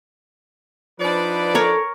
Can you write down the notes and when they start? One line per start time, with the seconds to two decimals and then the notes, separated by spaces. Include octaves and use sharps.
1.00 F3 D4 D#4 B4 D5
1.55 A4 A#4 C#5